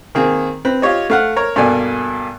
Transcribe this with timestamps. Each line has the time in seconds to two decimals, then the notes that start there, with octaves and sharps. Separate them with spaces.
0.15 D#3 A#3 C4 G#4
0.65 C4 B4
0.82 F4 G4 C#5 D#5
1.10 A3 F5 F#5
1.36 A#4 C#5 A#5
1.56 G2 B2 A#3 A4 D5 G#5